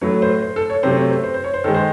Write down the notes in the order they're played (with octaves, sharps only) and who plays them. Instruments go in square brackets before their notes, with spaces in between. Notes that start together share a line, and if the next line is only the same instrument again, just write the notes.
[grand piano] A2 F#3 A3 C#5
C5
C5
A4
C#5
C3 F#3 A3 C5
C#5
C5
C5
C5
C#5
C5
D#3 A4
G#3
C5